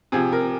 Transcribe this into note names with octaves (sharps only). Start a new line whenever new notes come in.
C3 F3 G#4
A#4